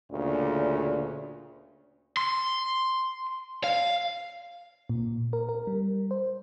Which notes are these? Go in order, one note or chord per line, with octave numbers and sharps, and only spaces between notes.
D2 A#2 C#3 D5
C6
F5
A#2
A#4
A#4
G3
C5